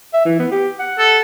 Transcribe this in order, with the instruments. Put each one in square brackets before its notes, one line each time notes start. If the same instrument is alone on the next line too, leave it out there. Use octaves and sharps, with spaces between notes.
[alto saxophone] E5
E3
B3
G4
F#5
[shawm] A4